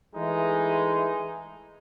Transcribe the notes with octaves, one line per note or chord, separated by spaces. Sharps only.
E3 G#3 A3 D#4